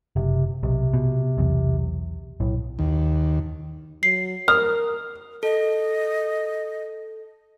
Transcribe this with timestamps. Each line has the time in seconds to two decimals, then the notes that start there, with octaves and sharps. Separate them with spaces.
0.16 F#1 C3
0.63 B1 C3
0.93 B2
1.38 B1 E2
2.40 B1 A2
2.79 D#2
4.03 F#3 C7
4.48 A#4 D#6 F6
5.43 A4 D#5